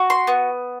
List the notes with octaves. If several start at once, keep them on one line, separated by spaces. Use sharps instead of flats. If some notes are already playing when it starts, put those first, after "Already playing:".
Already playing: F#4
C6
B3